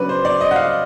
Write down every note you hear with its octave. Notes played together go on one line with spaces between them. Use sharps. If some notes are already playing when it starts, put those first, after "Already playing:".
Already playing: C#3 F#3 B3 D4 B4 D5
C5
D5
D#5
F#5
F5